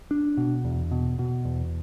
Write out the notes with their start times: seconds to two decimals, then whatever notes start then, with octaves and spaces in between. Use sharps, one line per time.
0.11 D4
0.37 B2
0.65 E2
0.91 B2
1.19 B2
1.45 E2